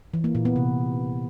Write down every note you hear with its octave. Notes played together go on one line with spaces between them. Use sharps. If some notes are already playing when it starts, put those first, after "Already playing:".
E3
A#3
A#2
B3
C3